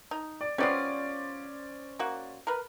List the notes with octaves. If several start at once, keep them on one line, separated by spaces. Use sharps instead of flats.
D#4
D5
G3 B3 C#4 F4 C5 D5
A#3 F#4
A#4 B4